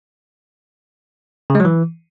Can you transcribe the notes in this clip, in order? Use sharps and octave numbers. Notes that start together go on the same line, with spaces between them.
C#3
G#3
F#3
E3